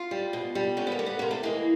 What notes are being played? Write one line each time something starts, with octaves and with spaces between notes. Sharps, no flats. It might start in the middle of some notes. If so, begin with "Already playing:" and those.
Already playing: F4
G3
B2
G3
D3 C#4
B3
A#3
G3
B3
C3 A#3
A3
E3 G#3 A#3